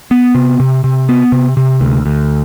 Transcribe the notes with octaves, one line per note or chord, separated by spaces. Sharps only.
B3
C3
C3
C3
B3
C3
C3
D2
D2